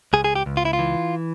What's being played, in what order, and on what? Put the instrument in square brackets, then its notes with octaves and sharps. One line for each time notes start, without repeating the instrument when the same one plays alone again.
[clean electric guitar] C#2 G#4
G#4
G4
C#2
F4
E4
F4
E3